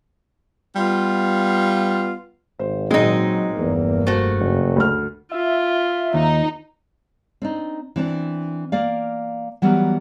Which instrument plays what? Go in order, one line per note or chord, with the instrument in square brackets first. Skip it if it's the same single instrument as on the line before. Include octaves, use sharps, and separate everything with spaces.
[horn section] G3 B3 F4
[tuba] G#1 [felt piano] C5
[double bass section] A#2 F#3 [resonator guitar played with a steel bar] G#3 D#4 [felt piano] C4
[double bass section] F1 G2 A#3 [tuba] E2
[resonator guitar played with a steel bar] A3 F#4 [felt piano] C5
[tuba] F#1
[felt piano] D2 F6
[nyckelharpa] F4 [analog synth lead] E5
[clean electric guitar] D#2 [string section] D#4
[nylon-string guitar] C4 D4 D#4
E3 C4 D4
A#3 D5 F5
E3 F#3 G3 B3 A#4